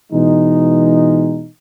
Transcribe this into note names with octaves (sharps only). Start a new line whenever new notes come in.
B2 E3 G#3 D#4